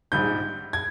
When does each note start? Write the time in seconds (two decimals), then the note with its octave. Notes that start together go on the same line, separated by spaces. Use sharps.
0.12 A#1 G#2 G3 G6
0.73 G#6